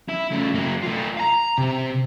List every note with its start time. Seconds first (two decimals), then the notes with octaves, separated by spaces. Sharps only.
0.09 E4
0.32 C#3 A3
0.55 F#3 A#3
0.83 A3 F4
1.17 F5 A#5
1.58 C3